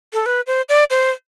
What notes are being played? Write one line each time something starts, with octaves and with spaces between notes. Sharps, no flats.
A4
B4
C5
D5
C5